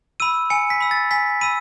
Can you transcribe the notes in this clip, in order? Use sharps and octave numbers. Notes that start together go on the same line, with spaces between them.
B5 E6 D#7
G#5 C#7
B6
B5 E6
A6
G#5 B6
B5 E6 D#7